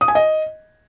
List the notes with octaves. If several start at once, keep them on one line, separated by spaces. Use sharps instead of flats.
D#6
G#5
D#5